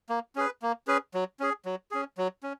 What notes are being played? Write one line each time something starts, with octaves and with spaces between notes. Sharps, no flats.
A#3
C#4 G#4 B4
A#3
C#4 G#4 B4
F#3
C#4 G#4
F#3
C#4 G#4
F#3
C#4